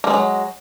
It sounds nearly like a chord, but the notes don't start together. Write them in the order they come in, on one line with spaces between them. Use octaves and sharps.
A#3 G#3 D#3 F#3